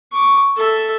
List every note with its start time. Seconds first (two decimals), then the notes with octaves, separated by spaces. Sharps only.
0.12 C#6 D6
0.56 A4 E5